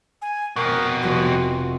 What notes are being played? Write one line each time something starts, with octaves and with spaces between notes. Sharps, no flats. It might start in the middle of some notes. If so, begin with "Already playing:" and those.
G#5
F2 B2 A#4
F1 F#4 C6